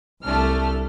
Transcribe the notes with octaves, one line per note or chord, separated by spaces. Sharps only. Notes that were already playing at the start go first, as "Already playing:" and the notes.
C2 A3 D4 F6